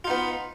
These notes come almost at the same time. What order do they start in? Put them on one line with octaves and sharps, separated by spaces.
F4 D#4 B3